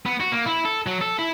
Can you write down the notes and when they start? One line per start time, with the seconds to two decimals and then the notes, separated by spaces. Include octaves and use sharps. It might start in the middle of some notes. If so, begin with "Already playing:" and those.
0.06 B3
0.20 F#4
0.32 A#3
0.46 E4
0.65 A4
0.87 F#3
1.01 A4
1.19 E4